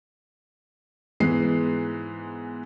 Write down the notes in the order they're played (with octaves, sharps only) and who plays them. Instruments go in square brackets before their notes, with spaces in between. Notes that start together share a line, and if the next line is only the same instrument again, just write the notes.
[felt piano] G#2 E3 G#3 B3 C7